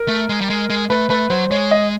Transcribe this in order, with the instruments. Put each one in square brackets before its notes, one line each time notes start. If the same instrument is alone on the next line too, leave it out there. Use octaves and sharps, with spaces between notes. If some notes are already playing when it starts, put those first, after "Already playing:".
Already playing: [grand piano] A#4
[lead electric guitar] A3
G#3
G3
G#3
G#3
[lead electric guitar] A3 [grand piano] B4
[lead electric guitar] A3 [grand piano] B4
[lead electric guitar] F#3 [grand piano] C5
[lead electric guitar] G#3 [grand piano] C#5
[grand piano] D#5